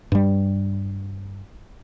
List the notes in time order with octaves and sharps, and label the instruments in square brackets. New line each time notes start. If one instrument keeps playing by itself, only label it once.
[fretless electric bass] G2 G3